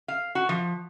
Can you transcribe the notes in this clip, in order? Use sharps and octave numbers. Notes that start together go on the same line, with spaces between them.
F5
F#4
F3